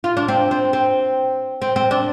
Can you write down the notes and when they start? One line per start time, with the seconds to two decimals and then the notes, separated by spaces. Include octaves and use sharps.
0.04 F4
0.17 D4
0.28 C4
0.51 C4
0.73 C4
1.62 C4
1.76 C4
1.91 D4